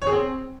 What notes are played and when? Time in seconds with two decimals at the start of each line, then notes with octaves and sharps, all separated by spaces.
0.02 C#5
0.07 G#4
0.12 C4